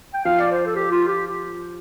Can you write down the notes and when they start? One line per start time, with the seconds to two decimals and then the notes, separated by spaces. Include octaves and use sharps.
0.14 G5
0.25 F3 F5
0.40 D5
0.51 C5
0.66 A4
0.75 G4
0.91 F4
1.07 G4